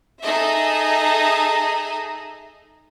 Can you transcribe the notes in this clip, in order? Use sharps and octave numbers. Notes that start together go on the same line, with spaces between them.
D#4 G#4 A4 D#5 E5